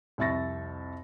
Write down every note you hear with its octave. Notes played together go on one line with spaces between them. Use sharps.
C2 F2 E5 C#6 A6 A#6